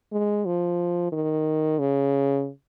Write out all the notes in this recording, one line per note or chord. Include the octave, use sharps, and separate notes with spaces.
G#3
F3
D#3
C#3